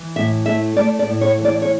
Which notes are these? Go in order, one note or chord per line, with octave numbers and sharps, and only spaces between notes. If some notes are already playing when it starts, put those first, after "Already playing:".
Already playing: E3
A2 E5
A3 E5
A3 D5
D5
A2
C#5
E3
D5
C#5